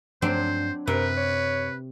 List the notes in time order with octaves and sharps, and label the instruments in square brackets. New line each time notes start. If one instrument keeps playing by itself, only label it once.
[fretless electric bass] G2 F3 A3 [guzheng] F#3 C4 D4 [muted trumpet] C5
[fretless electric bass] F#2 [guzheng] C3 [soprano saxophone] A#4 [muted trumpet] B4
[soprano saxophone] C#5